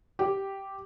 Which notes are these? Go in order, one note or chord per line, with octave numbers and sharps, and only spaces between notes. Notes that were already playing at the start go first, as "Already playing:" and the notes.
G4